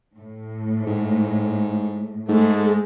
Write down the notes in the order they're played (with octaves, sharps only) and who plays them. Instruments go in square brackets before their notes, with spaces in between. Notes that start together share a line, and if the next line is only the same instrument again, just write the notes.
[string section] A2
[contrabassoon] G#2
[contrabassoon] G#2 [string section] G#3 A3